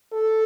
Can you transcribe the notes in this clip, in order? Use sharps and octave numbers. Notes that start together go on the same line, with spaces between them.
A4